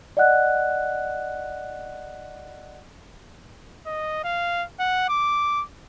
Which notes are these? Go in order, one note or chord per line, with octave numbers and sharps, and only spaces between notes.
D5 D#5 F#5 F#6
D#5
F5
F#5
D6